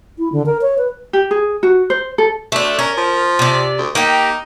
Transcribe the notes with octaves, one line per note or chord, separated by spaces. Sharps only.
E4
D3
A#4
C#5
B4
G4
G#4
F#4
C5
A4
D2 A3 D4
C#4 A#4
F3
C3 D5
D2
A#3 D#4 G4